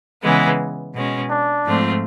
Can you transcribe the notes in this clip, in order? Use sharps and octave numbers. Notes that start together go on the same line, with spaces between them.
C#3 E3 G#3 B3
B2 G#3 C#4
D4
G#2 F3 A3 C4 F4